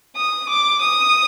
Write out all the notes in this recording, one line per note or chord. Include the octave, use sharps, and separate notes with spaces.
D#6
D6
D#6